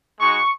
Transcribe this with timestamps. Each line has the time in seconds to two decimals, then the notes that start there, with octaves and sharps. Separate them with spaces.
0.19 G#3 D#4 F#4 C#6